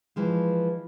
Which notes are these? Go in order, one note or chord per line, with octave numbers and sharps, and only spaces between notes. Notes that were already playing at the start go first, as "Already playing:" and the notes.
E3 F3 G#3